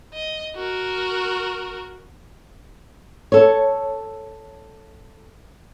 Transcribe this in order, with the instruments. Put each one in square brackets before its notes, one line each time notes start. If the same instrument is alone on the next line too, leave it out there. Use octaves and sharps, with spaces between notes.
[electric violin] D#5
F#4 A#4
[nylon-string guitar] A4 C#5